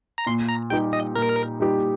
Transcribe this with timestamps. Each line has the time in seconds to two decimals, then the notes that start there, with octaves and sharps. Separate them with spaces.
0.18 A#5
0.26 A#2 C6
0.49 A#5
0.70 G3 D#4 G4 G5
0.93 D#5
1.15 A#2 A#4
1.60 G3 D#4 G4